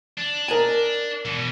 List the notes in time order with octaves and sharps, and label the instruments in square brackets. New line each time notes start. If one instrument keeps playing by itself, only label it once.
[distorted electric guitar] D4
[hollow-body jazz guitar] A#4 D#5 G#5
[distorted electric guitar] B2 E3